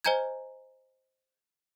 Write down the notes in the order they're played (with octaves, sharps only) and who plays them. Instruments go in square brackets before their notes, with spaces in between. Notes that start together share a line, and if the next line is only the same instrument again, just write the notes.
[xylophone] C5 D#5 G#5 A#5 G6 G#6